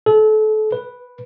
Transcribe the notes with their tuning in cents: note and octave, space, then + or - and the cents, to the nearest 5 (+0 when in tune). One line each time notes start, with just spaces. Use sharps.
A4 -30
B4 -5